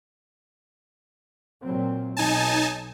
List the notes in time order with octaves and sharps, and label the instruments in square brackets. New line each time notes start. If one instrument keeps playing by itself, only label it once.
[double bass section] A#2 F#3 C4
[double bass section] B1 [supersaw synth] D#4 G#5 A5